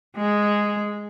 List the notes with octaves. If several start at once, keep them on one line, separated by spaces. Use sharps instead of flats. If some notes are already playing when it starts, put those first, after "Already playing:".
G#3